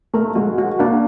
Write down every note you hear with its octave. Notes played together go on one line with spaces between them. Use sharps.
A3 A#4
G#3 F#4
F#4
A#3 D4